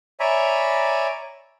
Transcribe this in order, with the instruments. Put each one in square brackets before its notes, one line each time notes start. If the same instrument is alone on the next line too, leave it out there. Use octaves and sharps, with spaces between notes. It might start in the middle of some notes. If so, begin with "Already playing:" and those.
[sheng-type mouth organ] C#5 D5 E5 G#5 A#5 B5